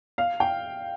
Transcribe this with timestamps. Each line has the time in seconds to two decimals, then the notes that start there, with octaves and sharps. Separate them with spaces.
0.18 F5
0.40 G5